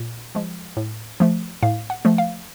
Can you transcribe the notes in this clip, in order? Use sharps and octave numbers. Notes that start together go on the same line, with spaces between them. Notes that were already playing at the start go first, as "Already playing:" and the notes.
Already playing: A#2
F3 G#3
A2
F3 A3
A2 F5
F#5
F3 A3
F5